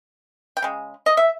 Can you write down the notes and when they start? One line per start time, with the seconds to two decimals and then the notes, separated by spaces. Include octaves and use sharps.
0.57 G5
0.62 C#3 G#3
1.06 D#5
1.17 E5